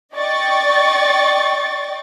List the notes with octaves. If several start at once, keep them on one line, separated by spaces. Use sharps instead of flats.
D5 D#5 G5 C#6 A6